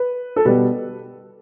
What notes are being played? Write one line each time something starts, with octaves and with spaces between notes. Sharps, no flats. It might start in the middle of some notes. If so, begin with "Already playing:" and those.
Already playing: B4
A4
B2 G3 B4